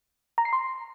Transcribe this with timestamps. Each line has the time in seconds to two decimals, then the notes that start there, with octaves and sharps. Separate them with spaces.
0.38 A#5
0.45 C7
0.53 C6